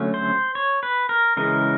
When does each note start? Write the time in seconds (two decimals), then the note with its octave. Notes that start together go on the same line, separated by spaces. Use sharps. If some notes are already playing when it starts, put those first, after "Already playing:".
Already playing: D3 F#3 A3 C#4
0.14 C5
0.55 C#5
0.83 B4
1.09 A#4
1.37 C#3 E3 G#3 A#4